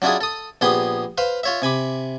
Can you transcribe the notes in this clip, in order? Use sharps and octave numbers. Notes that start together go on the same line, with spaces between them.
F#3 D4 E4 F4 G#4
A4 D#6
A#1 B3 G4 G#4 C6
B4 C5 F5
F4 C#5 E5
C3 G#5 B5 D6